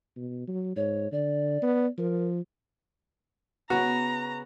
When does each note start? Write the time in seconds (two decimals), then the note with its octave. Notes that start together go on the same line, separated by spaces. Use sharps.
0.16 B2
0.48 F#3
0.76 G#2 C#5
1.12 D3 D5
1.62 B3
1.98 F3 A#4
3.70 C#3 B3 F#4 A#5